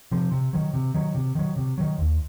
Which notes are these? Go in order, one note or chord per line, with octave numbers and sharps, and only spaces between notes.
C3 F3
C3
D#3 F#3
C3
D#3 F#3
C3
D#3 F#3
C3
D#3 F#3
D#2